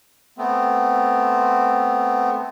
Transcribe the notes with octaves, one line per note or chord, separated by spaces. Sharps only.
A3 B3 C4